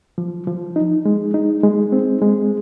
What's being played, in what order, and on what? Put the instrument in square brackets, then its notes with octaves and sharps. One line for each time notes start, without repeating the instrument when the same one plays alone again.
[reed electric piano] F3
F3
D#4
G#3
D#4
G#3
C4
G#3